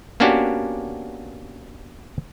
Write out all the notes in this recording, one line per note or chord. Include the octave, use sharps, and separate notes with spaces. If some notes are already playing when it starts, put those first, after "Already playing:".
A#3 B3 C#4 D4 F#4 G4